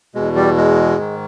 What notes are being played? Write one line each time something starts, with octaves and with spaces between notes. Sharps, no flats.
E2 B2 G#3
G3
G#3
G#2 D#3